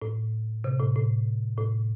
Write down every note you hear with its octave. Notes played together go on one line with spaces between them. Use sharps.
A2
C3
A2
A2
A2